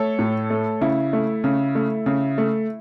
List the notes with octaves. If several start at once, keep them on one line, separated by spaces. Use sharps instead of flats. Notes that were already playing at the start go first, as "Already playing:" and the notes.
Already playing: A3 A4 C#5
A2
A3
C#3 E4
A3
C#3
A3
C#3
A3